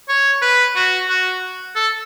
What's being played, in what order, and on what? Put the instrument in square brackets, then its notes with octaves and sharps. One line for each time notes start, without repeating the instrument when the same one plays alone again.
[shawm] C#5
B4
F#4
F#4
A4